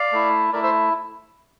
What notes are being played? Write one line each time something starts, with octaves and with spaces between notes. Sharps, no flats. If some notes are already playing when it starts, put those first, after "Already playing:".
Already playing: D5 F5
A3 E4
A3 E4 A#4 D5
C5 E5